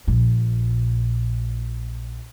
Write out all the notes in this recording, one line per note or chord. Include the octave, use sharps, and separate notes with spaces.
A#1 A#2